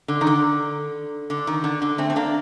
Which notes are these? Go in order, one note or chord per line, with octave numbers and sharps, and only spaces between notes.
D3
D#3
D3
D3
D#3
D3
D3
A3 C4
C4
A#3 D4